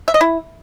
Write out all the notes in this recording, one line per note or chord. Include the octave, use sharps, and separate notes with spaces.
E5
D#5
E4